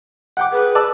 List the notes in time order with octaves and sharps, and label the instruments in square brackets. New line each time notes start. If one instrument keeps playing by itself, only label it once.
[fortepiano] F#5 G5 D6
[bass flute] G#4 [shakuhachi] B4
[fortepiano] D5 A5 E6